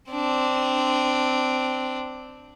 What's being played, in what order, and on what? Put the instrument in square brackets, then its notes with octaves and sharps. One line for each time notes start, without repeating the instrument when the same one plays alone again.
[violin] C4 D4